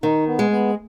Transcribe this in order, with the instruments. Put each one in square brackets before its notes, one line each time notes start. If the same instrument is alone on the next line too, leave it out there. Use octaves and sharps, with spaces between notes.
[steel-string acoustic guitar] D#3 [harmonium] D#4
[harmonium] B3
[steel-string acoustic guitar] G#3
[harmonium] B3